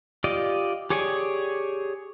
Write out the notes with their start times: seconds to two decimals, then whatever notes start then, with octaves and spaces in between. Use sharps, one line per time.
0.24 F4 G4 D5 D#5
0.90 G4 G#4 C#5 D5 G#5